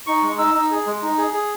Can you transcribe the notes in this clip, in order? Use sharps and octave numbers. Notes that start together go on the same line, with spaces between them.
D#4 C#6
G#3
D#4 E6
D#4
G#4
G#3
D#4
G#4
G#4